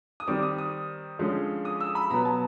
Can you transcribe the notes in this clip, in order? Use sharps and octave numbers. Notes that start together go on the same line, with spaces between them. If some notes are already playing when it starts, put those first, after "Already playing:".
D#6
D#3 G3 C4 D6
D#6
D#6
D3 F3 G#3 C#4
D#6
E6
B5
B2 F#3 B3 A#5
A5